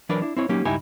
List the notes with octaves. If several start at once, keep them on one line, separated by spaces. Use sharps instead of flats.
E3 F#3 D4 A#4 B4 D5
D4 E4
C4 E4 C#5
F#3 A#3 C#4 D#4 G4
C#2 G2 D#4 E4 G4 G#5